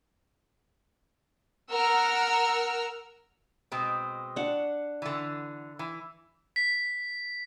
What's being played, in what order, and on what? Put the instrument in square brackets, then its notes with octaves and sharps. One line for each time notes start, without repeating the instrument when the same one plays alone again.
[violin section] A#4 F#5 E6 F6
[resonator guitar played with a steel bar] B2 G#3 C4
[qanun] D4 F#5
[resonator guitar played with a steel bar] D3 E3
E3
[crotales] B6